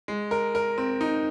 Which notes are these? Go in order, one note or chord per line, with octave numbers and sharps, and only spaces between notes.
G#3
A#4
A#4
C4
D#4